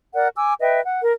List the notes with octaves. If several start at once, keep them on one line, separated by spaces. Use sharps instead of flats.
A#4 D5 F#5
G#5 D6 E6
B4 D#5 E5 G5
F#5
A#4